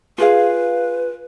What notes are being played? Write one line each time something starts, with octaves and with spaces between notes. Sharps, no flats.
F4 G#4 B4 F5